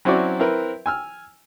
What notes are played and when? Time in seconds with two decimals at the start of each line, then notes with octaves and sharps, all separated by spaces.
0.05 F#3 C4 C#4 E4 F#4 D5
0.39 C4 E4 A#4 B4
0.86 G#5 E6 F6